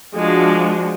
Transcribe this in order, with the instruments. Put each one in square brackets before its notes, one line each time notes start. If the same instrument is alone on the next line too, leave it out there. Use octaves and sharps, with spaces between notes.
[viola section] F3 G#3 D4 F#4